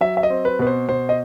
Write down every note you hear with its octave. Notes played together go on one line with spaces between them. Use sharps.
F#3 E5
E5
D#5
C4
B4
B2 B4
C5
B2 C5
D#5